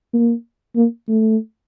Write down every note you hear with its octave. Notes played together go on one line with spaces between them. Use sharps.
A#3
A#3
A3